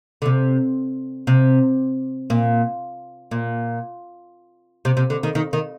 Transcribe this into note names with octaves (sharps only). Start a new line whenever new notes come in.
D3
C3
C3
A#2
A#2
C3
C3
D3
D#3
D#3
D#3